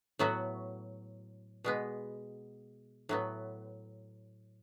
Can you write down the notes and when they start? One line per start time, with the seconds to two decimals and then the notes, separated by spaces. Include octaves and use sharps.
0.19 A2 F#3 B3 F#4
1.64 B2 G#3 B3
3.09 A2 F#3 B3